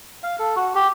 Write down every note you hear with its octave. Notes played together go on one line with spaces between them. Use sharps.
F5
A4
F#4
G4